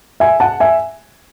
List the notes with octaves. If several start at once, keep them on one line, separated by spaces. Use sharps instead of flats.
E5 G#5
F#5 A5
E5 G#5